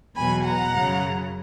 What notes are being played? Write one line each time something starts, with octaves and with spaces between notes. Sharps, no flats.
E2 B2 F#3 G#5 B5
F#5 A#5
F#2 C#3 F#3